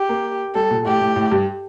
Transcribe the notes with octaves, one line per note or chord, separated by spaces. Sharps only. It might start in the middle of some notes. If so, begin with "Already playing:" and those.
Already playing: G4
A#3
G3 A4
A#2
A2 G4
A2
A2
G2